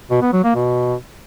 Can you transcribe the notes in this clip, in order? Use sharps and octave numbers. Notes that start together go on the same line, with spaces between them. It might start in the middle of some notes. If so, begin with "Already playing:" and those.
B2
B3
F#3
A#3
B2